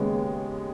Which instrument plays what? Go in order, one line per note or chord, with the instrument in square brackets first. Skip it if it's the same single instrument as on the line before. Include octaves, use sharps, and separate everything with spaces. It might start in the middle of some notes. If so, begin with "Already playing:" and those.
Already playing: [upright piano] D#2 C#3 G#3 B3